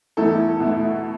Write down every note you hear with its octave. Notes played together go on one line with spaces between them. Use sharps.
E2 E3 A3 E4 A4
B2 A3 E4